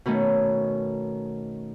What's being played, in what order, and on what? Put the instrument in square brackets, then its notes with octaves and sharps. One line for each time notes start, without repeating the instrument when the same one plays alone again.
[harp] B2 D#3 A3 C#4